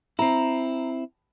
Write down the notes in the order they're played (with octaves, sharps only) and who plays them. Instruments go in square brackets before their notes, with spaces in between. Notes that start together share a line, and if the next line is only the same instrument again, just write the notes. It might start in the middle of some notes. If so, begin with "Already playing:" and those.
[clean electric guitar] C4 E4 [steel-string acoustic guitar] A#5